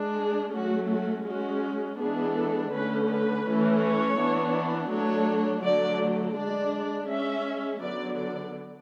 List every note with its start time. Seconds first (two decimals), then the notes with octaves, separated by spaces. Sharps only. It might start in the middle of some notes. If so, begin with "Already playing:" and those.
Already playing: G#3 D4
0.16 G#4
0.53 F#3 A3 C#4 F#4
0.89 F#4
1.25 G#3 C#4 F#4
1.99 E3 G#3 B3 D4 G#4
2.35 A4
2.71 D3 A3 C#4 B4
3.08 B4
3.44 E3 A3 C#4
3.80 C#5
4.17 E3 B3 D4
4.90 F#3 A3 D4 C#5
5.62 D3 F#3 A3 D5
6.36 G#3 D4 D5
7.08 G#3 C#4 E5
7.81 D3 F#3 B3 D5
8.17 D5